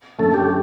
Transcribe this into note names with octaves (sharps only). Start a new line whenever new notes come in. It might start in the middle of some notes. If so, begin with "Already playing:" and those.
F#2 D3 A3 C#4 A4
G4